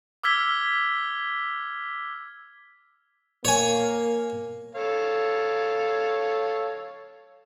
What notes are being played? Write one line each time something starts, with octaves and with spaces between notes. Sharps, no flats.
D6 E6 F6 G#6 B6 G7
A#3 C#5 G#5
A4 C#5 F5